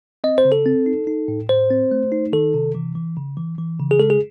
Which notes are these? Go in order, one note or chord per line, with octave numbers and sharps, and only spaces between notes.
C4 D#5
C5
C#3
A4
C4
D#4
D#4
A2
A2 C5
C4
A3
D#4
D#3 A4
C3
E3
E3
C#3
E3
E3
C#3
G#4
G#3 A4
G#4